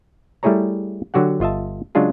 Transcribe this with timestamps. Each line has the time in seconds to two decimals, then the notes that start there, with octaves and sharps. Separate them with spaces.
0.43 G3 A3 E4 G#4 C#5 A#5
1.14 D3 F#3 F#4 G4 F#5
1.40 G1 F4 D#5 E5 A5
1.95 C#3 F#3 G#3 D4 F4 G#4